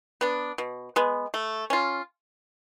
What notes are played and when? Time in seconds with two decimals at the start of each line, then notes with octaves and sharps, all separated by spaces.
0.21 B3 D4
0.58 B2
0.96 G#3 B3
1.34 A3
1.70 C#4 F4